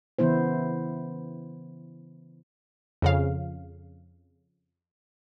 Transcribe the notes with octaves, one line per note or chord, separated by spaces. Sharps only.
C#3 E3 B3 E4 C5
F2 C#3 F5